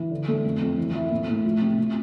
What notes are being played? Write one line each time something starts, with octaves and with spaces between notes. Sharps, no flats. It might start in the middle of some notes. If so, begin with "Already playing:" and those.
Already playing: E3
D3
A3
F2
F2
E3
E4
A2
A2
F3
C3
C3